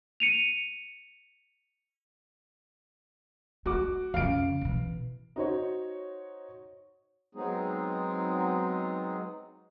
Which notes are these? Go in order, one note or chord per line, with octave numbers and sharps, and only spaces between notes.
C#7 D#7 F7
G#3 F#4 D6
F2 C#3 F5 D7
B2 E3
D#4 F#4 C5 C#5
F#3 G#3 B3 C4 D#4 G#4